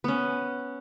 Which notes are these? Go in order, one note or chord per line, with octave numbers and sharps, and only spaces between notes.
B3 C#4